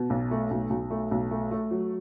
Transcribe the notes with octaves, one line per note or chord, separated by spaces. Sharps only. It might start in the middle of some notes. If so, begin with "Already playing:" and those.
Already playing: B2
B1
A3
B1
B1
A3
B1
A3
A3
F#3